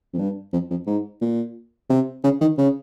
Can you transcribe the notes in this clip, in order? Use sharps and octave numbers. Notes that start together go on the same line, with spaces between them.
F2
G2
F2
F2
G#2
A#2
C3
C#3
D#3
C#3